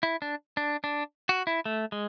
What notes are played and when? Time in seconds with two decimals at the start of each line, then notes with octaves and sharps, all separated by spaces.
0.03 E4
0.22 D4
0.57 D4
0.84 D4
1.29 F#4
1.47 E4
1.66 A3
1.92 G#3